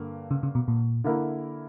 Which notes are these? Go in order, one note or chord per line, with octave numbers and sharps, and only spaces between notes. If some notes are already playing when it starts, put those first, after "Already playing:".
Already playing: G2 D3 A#3
C#3
C#3
B2
A#2
D3 A#3 E4 A#4 E5